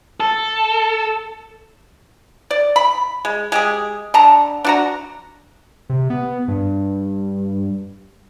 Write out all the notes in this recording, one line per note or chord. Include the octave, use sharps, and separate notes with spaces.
A4
D5
B5
G#3
G#3 G4 G#4
D3 A5 A#5
D4 F#4 A#5
C3
B3
G2